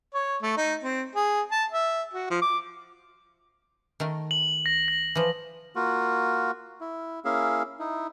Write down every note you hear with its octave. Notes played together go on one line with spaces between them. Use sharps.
C#5
A3
D#4
C4
G#4
A5
E5
F#4
F3
D6
D#3 A3 A#4
F#7
A#6
A#6
E3 F3
A#3 F4 F#4
E4
A#3 C#4 E4 G#4 E5 F5
D#4 E4